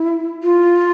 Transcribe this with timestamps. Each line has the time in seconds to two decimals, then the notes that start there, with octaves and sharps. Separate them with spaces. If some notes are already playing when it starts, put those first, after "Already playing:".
Already playing: E4
0.43 F4